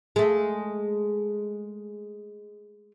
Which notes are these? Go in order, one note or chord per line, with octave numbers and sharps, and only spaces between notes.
G#3 A3